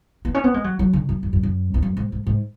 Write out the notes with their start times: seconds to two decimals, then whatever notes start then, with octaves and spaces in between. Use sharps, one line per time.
0.25 B3
0.34 C#4
0.44 B3
0.54 G#3
0.64 F#3
0.79 F#3
0.93 D3
1.09 F#2
1.23 F#2
1.33 F#2
1.43 F#2
1.74 E2
1.82 F#2
1.97 G#2
2.12 G#2
2.27 G#2